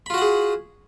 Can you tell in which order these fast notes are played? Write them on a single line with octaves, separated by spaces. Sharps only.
B5 F4 F#4 F#5 G#4